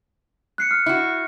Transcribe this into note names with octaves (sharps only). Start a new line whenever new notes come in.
F#6 C7 C#7
F6
E4 F#4